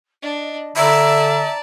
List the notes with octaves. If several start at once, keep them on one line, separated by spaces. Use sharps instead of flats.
D4 D#5
D3 D5 E5 A5 A#5